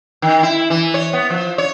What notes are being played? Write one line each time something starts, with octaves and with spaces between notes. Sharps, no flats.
D#3
E4
E3
C#5
B3
F3
C#5